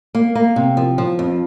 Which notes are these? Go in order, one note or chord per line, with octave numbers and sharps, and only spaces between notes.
A#3
A#3
C3
F3
F3
F2